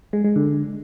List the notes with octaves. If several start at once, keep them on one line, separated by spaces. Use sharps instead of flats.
G#3
G#3
D3